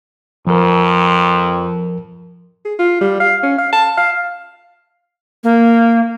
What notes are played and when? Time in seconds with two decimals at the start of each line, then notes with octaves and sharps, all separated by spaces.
0.47 F2 F3 A#4
2.65 G#4
2.79 F4
3.01 G3
3.20 F5
3.43 C#4
3.59 F5
3.72 A5
3.98 F5
5.44 A#3